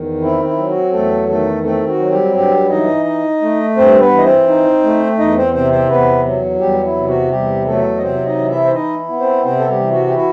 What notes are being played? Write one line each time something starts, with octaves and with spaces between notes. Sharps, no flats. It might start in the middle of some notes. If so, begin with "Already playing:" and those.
Already playing: E2 D#3
C4 E4
E4
F#3
F#4
E2 A3 A4
D#3 A3 A4
A3 C4 A4
F#4
F#3
G3 G4
G2 G3 G4
E3 D#4 D#5
D#4
A3
G2 C4 C5
B3 B4
E3
D#5
C4 C5
D#4
A3
E2 D#4 D#5
C4 C5
C3 C4 C5
C4 C5
E2 B3 B4
F#3
E2 G3 G4
E4
C3
F#4
E2 G3 G4
F#3 A3 A4
D#5
C3 C4 C5
D#4 D#5
E3
E4 E5
C5
D#4 E4 D#5
B3
C4 C5
C3 C4 C5
A4
G3 G4
E3
F#4
G4
E4 F#4